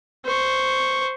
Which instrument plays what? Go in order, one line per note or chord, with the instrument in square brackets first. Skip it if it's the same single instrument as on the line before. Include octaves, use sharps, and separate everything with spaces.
[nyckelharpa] C5 C#6